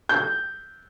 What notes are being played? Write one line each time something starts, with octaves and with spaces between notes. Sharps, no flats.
G6